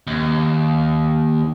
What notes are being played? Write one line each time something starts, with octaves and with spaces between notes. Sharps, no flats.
D#2